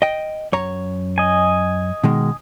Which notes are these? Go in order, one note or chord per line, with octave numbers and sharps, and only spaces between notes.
D#5 G5
F#2 C#5 A#5
D#5 G#5
B2 D#3 G#3